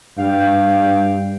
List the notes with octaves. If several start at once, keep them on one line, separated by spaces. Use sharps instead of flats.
G2 F5 G5